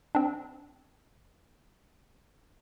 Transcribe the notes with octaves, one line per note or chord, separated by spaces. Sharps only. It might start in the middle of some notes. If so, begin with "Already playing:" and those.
C4 D4